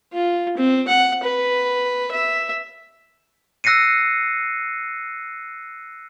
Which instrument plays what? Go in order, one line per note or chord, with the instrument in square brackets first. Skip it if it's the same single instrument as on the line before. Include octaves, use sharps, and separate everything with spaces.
[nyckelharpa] F4
C4
F#5
B4
E5
[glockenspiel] E6 F#6 A#6 C7 C#7 D#7